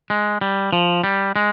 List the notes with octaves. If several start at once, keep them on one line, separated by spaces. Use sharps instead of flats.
G#3
G3
F3
G3
G#3